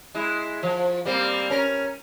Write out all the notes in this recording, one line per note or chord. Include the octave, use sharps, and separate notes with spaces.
G#3 E4
F3
G3 A#3 C4
C#4 A#4